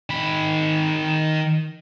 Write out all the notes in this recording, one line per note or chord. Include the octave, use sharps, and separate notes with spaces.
D#3 B5